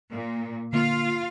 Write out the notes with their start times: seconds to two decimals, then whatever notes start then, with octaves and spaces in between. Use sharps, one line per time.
0.11 A#2
0.73 D3 A#3 F4 F5